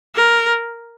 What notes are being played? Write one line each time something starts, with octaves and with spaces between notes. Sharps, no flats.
A#4